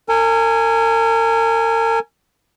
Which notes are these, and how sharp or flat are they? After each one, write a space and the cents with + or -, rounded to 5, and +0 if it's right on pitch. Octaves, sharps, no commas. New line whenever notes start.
A#4 -40 G#5 +0